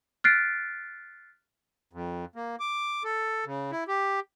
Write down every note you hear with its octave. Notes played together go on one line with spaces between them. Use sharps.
F6 F#6 A6 B6 C7 D7
F2
A#3
D6
A4
C#3
E4
G4